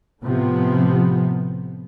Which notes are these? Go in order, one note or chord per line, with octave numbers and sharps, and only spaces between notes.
A2 C3 F3 B3